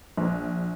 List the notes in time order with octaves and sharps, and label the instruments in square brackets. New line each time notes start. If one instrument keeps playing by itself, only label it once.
[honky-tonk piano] A#1